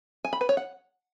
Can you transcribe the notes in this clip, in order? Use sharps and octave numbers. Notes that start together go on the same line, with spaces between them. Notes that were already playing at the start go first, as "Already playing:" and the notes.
G#5
B5
B4
C#5
F#5